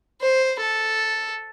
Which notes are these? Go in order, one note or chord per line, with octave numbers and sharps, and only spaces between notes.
C5
A4